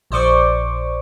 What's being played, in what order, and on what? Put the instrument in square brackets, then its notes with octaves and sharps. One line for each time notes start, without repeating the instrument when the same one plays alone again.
[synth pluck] A#1 C5 D5 C#6 D6